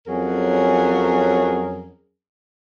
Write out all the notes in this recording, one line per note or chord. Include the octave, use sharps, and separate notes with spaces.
F2 F#3 C#4 G#4 A#4